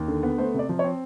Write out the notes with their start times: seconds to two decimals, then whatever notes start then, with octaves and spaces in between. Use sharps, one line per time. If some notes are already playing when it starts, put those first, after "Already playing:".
Already playing: D#2
0.08 D3
0.23 B3
0.38 A3 C5
0.54 C3 D5
0.69 F3
0.79 C#5
0.84 C4